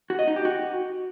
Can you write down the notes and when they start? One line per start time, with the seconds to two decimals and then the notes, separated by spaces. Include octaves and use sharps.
0.10 F#4
0.19 D#5
0.28 D#4
0.36 G4
0.45 F#4